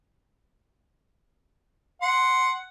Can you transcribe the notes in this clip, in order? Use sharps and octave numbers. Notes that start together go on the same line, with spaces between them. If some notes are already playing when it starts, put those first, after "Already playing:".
F#5 C6